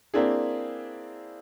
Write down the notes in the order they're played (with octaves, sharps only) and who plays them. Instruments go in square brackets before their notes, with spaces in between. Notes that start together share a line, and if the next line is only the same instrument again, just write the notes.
[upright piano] A#3 C4 D4 E4 G#4